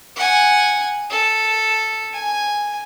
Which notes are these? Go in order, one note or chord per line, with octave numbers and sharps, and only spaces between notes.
F#5 G#5
A4
G#5